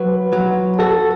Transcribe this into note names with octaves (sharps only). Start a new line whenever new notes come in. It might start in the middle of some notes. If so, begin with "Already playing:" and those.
Already playing: F#3 B4
F#3
F#4 A4